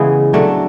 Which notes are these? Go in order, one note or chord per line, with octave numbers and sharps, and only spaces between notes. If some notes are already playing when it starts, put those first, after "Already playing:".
Already playing: C#3 E3 G#3 B3
F#3 A3 D4